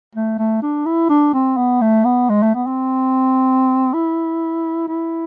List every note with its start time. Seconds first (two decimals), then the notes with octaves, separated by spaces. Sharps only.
0.16 A3
0.39 A3
0.62 D4
0.86 E4
1.10 D4
1.34 C4
1.57 B3
1.81 A3
2.05 B3
2.30 G#3
2.42 A3
2.55 B3
2.66 C4
3.94 E4
4.88 E4